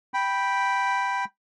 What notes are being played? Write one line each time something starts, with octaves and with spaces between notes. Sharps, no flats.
G5 B5